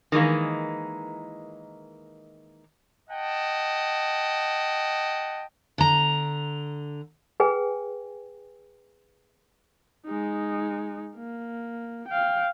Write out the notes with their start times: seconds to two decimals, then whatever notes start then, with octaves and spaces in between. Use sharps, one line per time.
0.12 D#3 E3 G#3 A#3
3.10 D#5 F#5 G5 A5
5.78 D3 A#5
7.40 G#4 B4 G5 G#5
10.06 G#3 D#4
11.16 A#3
12.08 F5 G5